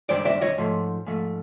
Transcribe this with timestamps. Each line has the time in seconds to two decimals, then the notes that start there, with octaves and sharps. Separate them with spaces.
0.09 G2 D#3 G#3 C5 D5
0.25 D5 E5
0.41 C#5 D#5
0.58 G#2 F3 A3
1.06 G#2 F3 A3